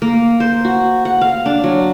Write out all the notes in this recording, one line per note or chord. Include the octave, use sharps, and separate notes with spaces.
A#3
C5
F#4
F#5
F5
D4
F#3